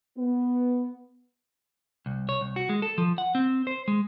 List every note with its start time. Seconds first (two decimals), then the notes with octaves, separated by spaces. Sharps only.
0.17 B3
2.06 C2
2.29 C#5
2.41 C2
2.56 F#4
2.69 G#3
2.82 A4
2.98 F3
3.18 F#5
3.35 C4
3.67 C5
3.88 G#3